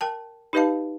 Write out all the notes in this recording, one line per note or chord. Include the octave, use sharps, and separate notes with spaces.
A#4 G5 A5
D#4 G4 B4 D#5 F5 A5